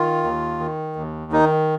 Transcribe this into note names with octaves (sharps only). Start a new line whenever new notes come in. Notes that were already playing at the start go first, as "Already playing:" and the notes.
Already playing: D#3 F4
D#2
D#3
D#2
D#3 D#4